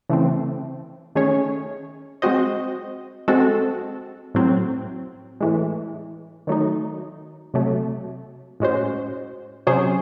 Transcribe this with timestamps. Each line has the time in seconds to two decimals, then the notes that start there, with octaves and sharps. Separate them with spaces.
0.09 C#3 E3 A3 C4
1.15 D#3 A3 C#4 G#4 C#5
2.22 G#3 C4 F#4 C5 D#5
3.28 G#3 C4 F#4 A4
4.35 A2 F#3 C4
5.41 A2 E3 G#3
6.47 D#3 F#3 A3 D#4
7.54 C3 F#3 A3
8.60 A2 G#3 C#4 F#4 C5
9.67 C3 F#3 C#4 G#4 C5